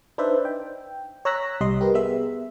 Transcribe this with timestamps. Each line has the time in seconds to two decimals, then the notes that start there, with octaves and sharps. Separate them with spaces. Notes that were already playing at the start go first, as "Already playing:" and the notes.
0.18 D4 D#4 B4 C5 D5 E5
0.45 G5
1.25 C#5 A#5 E6 F#6 A#6 B6
1.61 C2 G3 D#5 C6
1.81 G4 A#4 B4
1.95 B3 G#4 E5